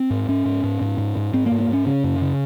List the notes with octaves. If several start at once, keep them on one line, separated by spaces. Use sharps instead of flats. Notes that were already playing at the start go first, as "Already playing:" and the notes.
Already playing: C4
G#2
G#2 C#4
G#2
G#2
G#2
G#2
G#2
G#2 C4
A#3
G#2
A#3
G#2 C#4
C#3 C#4
F#2
C#3